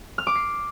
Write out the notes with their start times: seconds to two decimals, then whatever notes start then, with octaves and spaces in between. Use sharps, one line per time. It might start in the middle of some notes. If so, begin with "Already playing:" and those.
0.18 F6
0.27 D6
0.35 C7